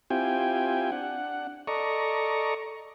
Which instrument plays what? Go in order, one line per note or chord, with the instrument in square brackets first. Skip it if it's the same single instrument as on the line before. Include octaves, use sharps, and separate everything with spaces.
[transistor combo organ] C4 E4 F4 G4 G5 G#5
D4 F#5
A4 D5 D#5 A#5 C#6